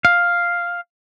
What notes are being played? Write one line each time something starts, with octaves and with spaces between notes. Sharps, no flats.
F5